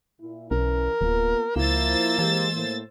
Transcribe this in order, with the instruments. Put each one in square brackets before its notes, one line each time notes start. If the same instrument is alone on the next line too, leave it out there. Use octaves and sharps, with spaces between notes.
[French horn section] A#2 E4
[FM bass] B1 [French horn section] E3 C#4 [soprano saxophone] A#4
[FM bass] D1 [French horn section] A#3 B3 F4
[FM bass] C#2 [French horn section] F3 E4 [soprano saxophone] A#3 [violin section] C5 E6 A6
[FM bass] E3 [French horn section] G#3 G4
[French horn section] A2 A#3